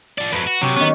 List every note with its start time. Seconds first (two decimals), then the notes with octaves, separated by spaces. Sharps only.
0.18 F3 D5
0.32 F2 F#3 B4 B5
0.47 F#4
0.61 C3 F#3 F#4 G4
0.76 D#3 B3 C#4